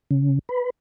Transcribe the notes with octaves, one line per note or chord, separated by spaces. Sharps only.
C#3
B4